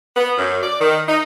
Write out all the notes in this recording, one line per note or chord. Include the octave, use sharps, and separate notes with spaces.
B3
F#2
D5
D#3
D#4